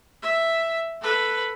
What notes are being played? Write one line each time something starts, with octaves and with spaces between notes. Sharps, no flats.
E5
A4 B4